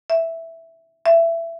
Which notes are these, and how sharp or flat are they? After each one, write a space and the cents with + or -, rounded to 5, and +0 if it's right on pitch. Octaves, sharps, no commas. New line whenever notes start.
E5 +0
E5 +20